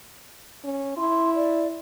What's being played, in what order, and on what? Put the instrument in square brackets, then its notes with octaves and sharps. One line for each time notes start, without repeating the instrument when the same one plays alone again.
[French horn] C#4
[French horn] E4 [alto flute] C6
[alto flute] D5